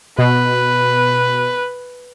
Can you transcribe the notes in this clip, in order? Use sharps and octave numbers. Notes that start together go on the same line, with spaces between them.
B2 B4